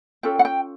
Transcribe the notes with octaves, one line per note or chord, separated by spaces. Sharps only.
C#4 F4 A4 G5
F#5
G5